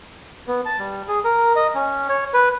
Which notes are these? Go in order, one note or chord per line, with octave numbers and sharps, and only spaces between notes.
B3
A5
G3
G#4
A#4
D#5
C#4
C#5
B4